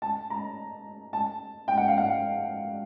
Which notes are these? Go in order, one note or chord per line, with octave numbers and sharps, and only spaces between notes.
A5
A#5
A5
G5
F#5
F5
F#5